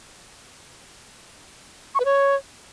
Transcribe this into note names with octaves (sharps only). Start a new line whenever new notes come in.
C#6
B4
C#5